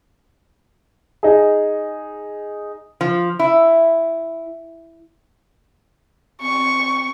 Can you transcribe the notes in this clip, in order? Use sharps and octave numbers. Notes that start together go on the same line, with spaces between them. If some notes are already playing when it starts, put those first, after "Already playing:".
D#4 G#4
F3
E4
C4 C#6